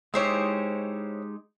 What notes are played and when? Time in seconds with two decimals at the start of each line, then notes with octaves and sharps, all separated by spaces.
0.14 G#3 D#4 E4 G4 C5 C#5